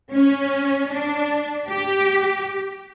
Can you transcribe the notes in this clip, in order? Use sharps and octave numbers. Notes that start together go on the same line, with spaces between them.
C#4
D4
G4